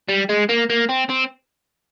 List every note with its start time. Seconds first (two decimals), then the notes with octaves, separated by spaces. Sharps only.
0.08 G3
0.29 G#3
0.49 A#3
0.70 A#3
0.89 C4
1.10 C4